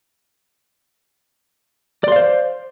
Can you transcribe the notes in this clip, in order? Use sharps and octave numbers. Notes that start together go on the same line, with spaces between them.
C5 D5 F5 C6